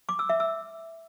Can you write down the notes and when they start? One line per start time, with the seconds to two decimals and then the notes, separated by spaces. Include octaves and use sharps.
0.09 D6
0.19 E6
0.29 E5
0.40 E6